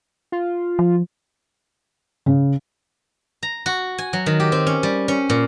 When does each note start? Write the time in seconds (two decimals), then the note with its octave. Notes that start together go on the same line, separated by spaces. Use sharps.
0.32 F4
0.79 F3
2.26 C#3
3.43 A#5
3.66 F#4
3.98 G#5
4.13 F#3
4.26 D#3
4.40 G4
4.52 C4
4.67 C#4
4.83 G3
5.08 C#4
5.30 A#2